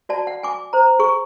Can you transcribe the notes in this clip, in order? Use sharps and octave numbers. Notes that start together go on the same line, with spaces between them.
F#4 D5 A5
F#5
G#5 D6
C5 A#5
G#4 C#6